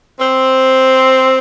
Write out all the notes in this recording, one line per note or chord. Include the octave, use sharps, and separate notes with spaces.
C4